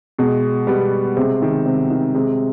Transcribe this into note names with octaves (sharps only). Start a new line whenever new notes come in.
B2 G#3
B2 G3 B3
C3 G#3 C4
D#3
C3
D#3
C3 G#3